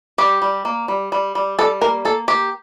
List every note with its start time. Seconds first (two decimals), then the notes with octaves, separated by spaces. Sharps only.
0.18 G3 G4
0.42 G3
0.65 A#3
0.88 G3
1.12 G3
1.35 G3
1.58 G3 A4
1.81 A#3 A#4
2.05 A#3 A4
2.28 A#3 G4